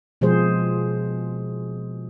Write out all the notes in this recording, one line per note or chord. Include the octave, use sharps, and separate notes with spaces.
B2 F3 G#3 G#4 C5